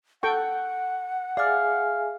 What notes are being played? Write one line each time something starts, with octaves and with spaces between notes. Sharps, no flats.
A4 F#5 G5 C#6
G#4 D5 E5 F5 G#5 F6